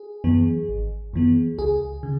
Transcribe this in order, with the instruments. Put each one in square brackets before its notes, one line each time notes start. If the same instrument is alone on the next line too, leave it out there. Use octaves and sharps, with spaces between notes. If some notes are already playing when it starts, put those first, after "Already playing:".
Already playing: [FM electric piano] G#4
F#2 E3 B3
G#1
F#2 E3 B3
C#2 G#4
C#3